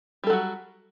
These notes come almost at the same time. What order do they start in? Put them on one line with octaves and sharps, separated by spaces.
G3 A4 F#3 F#4